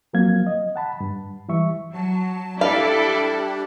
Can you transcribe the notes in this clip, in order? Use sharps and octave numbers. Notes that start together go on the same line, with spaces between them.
F3 F#3 A#3 C4 F5 G#6
D#5
F#5 A5 B5
G2
E3 G3 E5 C#6
F#3 A5
G3 D4 E4 G4 A4 D5 F5